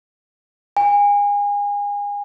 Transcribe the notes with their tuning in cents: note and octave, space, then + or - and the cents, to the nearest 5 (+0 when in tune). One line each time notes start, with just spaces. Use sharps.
G#5 -30